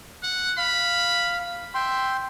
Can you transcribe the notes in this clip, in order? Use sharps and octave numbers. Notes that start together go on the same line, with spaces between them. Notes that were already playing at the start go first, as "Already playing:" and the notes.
F#5
F5 B5
E5 G5 C6